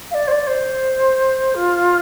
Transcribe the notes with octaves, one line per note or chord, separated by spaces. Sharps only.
F5
D5
C5
D5
C5
F4